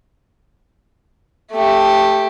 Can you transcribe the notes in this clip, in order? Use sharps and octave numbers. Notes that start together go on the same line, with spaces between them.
A3 G4